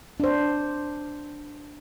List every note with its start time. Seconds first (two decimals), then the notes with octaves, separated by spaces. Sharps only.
0.20 D4 C5